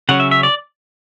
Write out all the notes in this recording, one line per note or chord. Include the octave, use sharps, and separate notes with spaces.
C#3 F#3 C#4 F#5
E5
E5
D5